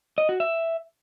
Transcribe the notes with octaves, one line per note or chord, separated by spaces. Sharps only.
D#5
F#4
E5